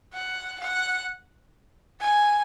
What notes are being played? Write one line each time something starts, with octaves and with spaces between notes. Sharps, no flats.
F#5
F#5
G#5